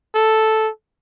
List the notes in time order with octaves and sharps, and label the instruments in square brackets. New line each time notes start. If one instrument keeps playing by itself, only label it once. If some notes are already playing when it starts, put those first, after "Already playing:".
[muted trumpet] A4